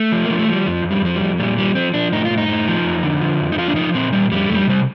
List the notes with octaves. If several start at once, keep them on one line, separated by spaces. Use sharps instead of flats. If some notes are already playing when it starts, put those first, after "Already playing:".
Already playing: A3
F3
A#3
F3
A3
F3 G3
F2 F3
F2
G3
F2 F3
G3
F3
A#2 G3
F3 G3
F3 C4
F3 D4
A2 D#4
F4
A2
D#4
A2
F3
F2
D3
F3
F2
D#4
F3 F4
D4
F3 D#4
A#2 C4
A#2 G3
F2 G3
F2 A3
G3
C3 G3